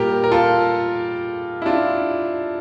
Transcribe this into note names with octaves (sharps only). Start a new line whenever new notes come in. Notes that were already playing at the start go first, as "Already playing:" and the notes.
Already playing: A#2 G3 G4 A#4
A#4
F4 A4
E4
D4 F4